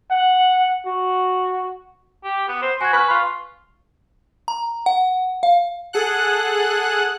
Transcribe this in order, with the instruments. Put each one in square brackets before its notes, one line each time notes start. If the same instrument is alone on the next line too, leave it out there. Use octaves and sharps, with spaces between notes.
[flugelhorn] F#5
F#4
[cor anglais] G4
B3
C5
[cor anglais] F#4 [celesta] G#5 G#6
[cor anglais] B4 [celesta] G#5 C#6 F6
[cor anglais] F4 [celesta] C#6
[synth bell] A#5
F#5
F5
[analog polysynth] G#4 A4 F#5 F#6